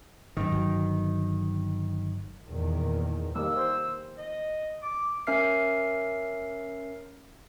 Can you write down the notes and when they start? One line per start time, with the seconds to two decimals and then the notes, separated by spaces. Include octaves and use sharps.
0.37 G#1 F#2 D#3
0.52 G1 F#3
2.48 E2 A#2 D#3
3.35 D#3 G3 A#3 E6
3.56 C5
4.18 D#5
4.82 D6
5.27 C#4 A#4 E5 F6 C7